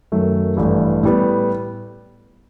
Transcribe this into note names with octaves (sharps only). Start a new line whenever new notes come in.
F#2 D#3 F#3 A3
A1 G2 E3 A3 E4
A2 G3 B3